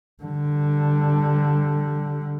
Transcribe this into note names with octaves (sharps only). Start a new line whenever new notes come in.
D3 G3